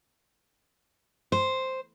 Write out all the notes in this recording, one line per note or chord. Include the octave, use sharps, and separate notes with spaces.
C5